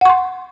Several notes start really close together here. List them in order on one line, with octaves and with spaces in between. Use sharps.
F#5 C#6 C6